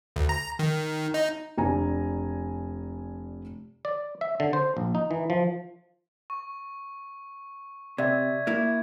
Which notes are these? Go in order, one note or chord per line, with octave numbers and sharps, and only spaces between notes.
D2
A#5
D#3
D#4
F1 D4 G#5 A#5
D5
E5
D3
C5
A#1
D#4
E3
F3
C#6
C3 D5 E5 G#6
A#3 E4